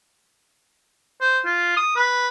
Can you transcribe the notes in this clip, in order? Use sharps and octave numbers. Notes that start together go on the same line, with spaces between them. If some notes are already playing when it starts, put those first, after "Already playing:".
C5
F4
D#6
B4